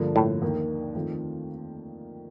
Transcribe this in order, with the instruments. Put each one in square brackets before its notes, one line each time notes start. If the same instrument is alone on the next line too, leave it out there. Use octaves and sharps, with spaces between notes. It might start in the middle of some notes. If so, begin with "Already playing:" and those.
Already playing: [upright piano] G2 D3 F3 A#3
[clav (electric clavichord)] A2
[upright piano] D#2 D#3 A#3
F2 D#3 A3 C4 F4